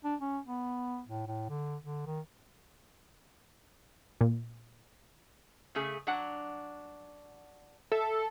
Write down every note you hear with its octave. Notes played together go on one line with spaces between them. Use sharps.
D4
C#4
B3
A2
A2
D3
D3
D#3
A#2
C#3 A3 G#4
F#3 D4 F#5
A4 E5